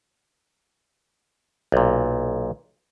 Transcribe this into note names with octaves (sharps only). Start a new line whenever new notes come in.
B1 A#2